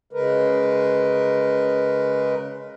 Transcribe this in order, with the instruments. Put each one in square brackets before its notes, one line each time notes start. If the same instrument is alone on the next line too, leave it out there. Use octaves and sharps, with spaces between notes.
[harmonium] C#3 G#3 A#4 B4